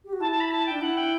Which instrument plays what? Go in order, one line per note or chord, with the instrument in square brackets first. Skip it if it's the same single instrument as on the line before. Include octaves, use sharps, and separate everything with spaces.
[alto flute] G4
F#4
[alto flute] E4 [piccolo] A5
[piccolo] A5
B5
A5
[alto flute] D4 [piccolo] G5
[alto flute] E4 [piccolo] F#5
[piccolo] G5